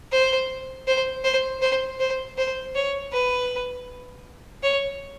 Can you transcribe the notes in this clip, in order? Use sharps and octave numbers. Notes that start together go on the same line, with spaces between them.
C5
C5
C5
C5
C5
C5
C#5
B4
C#5